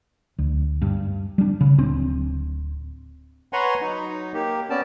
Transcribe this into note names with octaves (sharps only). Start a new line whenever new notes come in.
D2
G2
G3 D4
C#3
D1 C4 D4
B4 C#5 F#5 G#5 A#5 C6
F#3 D#4
A#3 G4
B3 C#4 D5 A5